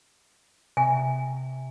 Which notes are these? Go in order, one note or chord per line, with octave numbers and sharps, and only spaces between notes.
C3 G#5